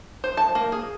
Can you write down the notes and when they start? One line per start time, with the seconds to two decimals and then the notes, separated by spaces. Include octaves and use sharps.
0.24 C5
0.37 A5
0.55 A#3
0.72 G#4